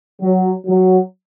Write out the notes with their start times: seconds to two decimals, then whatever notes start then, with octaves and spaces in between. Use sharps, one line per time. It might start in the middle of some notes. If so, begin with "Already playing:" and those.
0.21 F#3
0.67 F#3